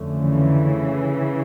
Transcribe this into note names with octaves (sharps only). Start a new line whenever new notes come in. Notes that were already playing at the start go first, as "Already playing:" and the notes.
Already playing: F2 D3 F3 A3 C#4
C#3 E3